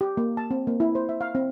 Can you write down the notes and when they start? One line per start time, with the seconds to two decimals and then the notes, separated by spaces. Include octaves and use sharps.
0.01 G4
0.17 A#3
0.37 A5
0.51 C4
0.67 A#3
0.80 E4
0.95 C5
1.09 E5
1.21 F5
1.35 C4